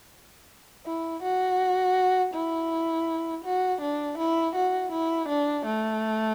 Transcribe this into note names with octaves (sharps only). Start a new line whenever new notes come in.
E4
F#4
E4
F#4
D4
E4
F#4
E4
D4
A3